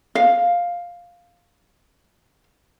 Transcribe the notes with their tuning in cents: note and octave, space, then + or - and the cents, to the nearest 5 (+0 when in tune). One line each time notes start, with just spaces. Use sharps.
F5 +5